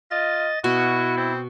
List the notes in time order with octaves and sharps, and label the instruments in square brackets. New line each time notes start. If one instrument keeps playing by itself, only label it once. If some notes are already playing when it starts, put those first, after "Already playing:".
[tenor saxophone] F4 [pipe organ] D#5 A6
[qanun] B2 [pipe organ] E4 [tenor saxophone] F#4
[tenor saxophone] C4